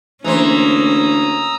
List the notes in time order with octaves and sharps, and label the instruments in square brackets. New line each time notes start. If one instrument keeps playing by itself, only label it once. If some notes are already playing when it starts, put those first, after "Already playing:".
[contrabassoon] D2 [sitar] E3 C5 [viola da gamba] A#3 C#4 [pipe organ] A#5 D#6 E6